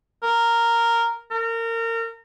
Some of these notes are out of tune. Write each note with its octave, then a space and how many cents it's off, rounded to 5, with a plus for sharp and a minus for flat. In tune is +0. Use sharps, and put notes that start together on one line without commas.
A#4 -5
A#4 -30